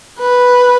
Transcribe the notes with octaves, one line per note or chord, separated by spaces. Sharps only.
B4